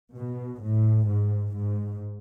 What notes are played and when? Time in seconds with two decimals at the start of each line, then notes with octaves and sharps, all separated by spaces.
0.14 B2
0.60 A2
1.07 G#2
1.54 G#2